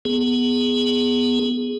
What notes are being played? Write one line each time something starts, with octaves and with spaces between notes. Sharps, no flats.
B3 G#4